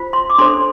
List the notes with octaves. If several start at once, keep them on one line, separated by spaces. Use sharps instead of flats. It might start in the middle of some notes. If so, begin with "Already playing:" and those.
Already playing: F4 C5
C6
D6
D4 A4 C5 C6